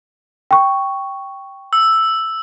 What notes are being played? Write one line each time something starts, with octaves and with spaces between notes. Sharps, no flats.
G5 C#6
E6